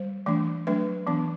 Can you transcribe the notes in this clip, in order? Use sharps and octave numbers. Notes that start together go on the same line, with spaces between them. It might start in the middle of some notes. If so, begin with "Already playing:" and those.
Already playing: G3 C5
E3 A3 D4
F#3 A3 D4 B4
E3 B3 D4